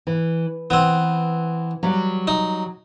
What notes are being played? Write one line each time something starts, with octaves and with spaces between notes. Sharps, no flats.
E3
E3 B3 C4
F#3 G3
D#4